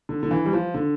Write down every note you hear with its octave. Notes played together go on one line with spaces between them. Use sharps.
D3
D3
E3
G3
F3
D3